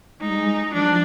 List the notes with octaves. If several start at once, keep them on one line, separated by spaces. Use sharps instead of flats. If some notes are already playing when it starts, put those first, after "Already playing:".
G#3 D#4
G3
G#3
F3 D4
G3
F3